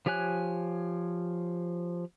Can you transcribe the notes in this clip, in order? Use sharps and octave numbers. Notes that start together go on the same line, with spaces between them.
F3 G4 C#5 G#5 F#6